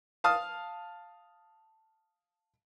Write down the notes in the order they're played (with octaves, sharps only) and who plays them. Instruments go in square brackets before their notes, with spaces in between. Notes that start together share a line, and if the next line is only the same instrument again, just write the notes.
[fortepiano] F5 A5 D#6 F6